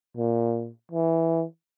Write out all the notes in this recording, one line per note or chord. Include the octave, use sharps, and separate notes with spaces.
A#2
E3